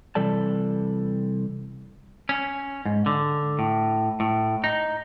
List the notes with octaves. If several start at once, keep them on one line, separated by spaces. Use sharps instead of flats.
C3 E3 G3 A4 D5 A5
C#4
G#2
D3
A2
A2
D#4